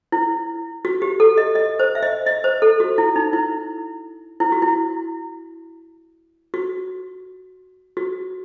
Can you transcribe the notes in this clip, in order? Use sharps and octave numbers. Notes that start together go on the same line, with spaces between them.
E4
F#4
G4
A4
D#5
D#5
C5
E5
D#5
D#5
C5
A4
F#4
E4
D#4
E4
E4
F#4
E4
F#4
F#4